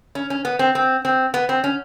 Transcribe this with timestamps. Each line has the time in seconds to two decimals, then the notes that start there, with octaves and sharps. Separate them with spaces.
0.15 C#4
0.30 C#4
0.45 B3
0.59 C4
0.75 C4
1.05 C4
1.34 B3
1.49 C4
1.64 C#4